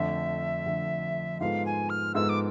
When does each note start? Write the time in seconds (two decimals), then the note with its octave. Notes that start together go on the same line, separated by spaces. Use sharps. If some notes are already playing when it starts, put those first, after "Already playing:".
Already playing: F2 D3 A3 E5
0.66 F2 D3 A3
1.40 G#2 G#3 B3 F4 A4 F5
1.66 G#5
1.90 F6
2.15 G#2 G#3 B3 F4 A4 E6
2.29 D6